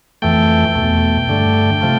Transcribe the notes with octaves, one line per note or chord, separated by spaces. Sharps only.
F2 E3 A3 G5
E2 B2 A3
G2 D3 A3
C3 F3 A3